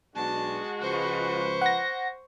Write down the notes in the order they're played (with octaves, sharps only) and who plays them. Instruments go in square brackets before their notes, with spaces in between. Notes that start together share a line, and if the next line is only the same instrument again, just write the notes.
[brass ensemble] B1 B2 D4 [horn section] G#3 F#4 [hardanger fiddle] A5
[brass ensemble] C#2 F3 B4 [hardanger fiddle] C5 C#6
[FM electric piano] F#5 A#6